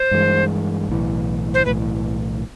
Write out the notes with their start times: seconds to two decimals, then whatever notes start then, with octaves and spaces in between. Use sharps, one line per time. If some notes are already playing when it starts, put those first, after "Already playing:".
Already playing: C5
0.11 G2 E3 G#3
0.89 B1 A2 E3
1.54 C5
1.65 B1 A2 E3 B4